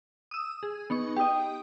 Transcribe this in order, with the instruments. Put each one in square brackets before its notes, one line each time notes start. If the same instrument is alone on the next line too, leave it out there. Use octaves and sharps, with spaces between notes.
[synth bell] D#6 E6
G#4
B3 D#4 C#6
[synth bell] G4 D#5 [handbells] G5 D#6